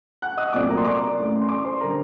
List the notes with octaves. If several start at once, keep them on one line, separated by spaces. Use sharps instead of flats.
F#5 F#6
D#5 D#6
C2 A#2 F#3 A3 C4 D5 D6
A#4 A#5
C6
D5 D6
A1 A2 A3
C6
D5 D6
C5 C6
D3 G3 A#4 A#5